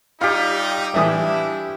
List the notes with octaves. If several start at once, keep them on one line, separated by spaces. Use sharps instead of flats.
G3 D#4 F4 G4 F5
A2 E3 G3 D4 E4 E5 G#5 D#6